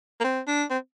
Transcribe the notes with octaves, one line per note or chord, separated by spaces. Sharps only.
A#3
C4
D4
C4